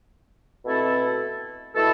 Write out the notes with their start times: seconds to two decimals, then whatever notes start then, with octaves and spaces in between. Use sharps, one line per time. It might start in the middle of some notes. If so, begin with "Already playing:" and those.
0.65 B2 A3 C4 E4 A4
1.74 B2 A3 E4 A4